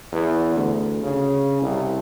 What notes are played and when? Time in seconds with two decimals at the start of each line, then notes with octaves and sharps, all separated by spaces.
0.12 E2
0.56 D2
1.02 C#3
1.61 C2